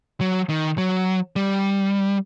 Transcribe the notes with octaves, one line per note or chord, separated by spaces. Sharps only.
F#3
D#3
F#3
G3